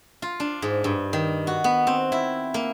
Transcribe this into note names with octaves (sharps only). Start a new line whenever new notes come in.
F4
D4
G#2
G2
D#3
F#4
B3
C4
E4
A#3